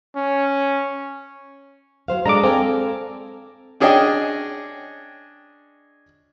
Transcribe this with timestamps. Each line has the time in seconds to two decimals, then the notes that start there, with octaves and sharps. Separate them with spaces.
0.16 C#4
2.08 F#3 C5 F5
2.26 G#3 D4 A4 A#5 D6
2.43 C4 A4 F5 G#5
3.80 C#4 D4 G#4 C#5 D#5 G5